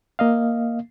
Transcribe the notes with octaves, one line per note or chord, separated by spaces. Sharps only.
A#3 D#5 F5